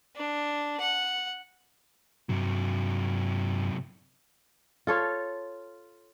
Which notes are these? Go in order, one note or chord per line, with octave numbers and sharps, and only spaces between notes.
D4
F#5
G2 C3 F#3
F4 A4 C#5 F5